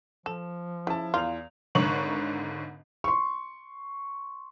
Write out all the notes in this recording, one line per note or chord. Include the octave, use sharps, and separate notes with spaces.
F3 A4 E7
C#3 E4 A5
E2 F4 F5 F7
G#1 G#2 D3 C#5 C#6 F#7
C6 C#6